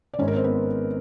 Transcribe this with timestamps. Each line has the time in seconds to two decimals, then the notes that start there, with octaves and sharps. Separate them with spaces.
0.14 D5
0.18 G#1 G#2 D#3 C#4 C#5
0.28 A#4
0.35 C4 C5
0.44 B3 B4